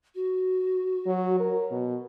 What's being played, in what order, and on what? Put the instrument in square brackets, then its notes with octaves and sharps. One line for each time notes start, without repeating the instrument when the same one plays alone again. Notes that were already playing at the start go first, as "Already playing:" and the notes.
[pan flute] F#4
[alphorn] F#3
A#4
B2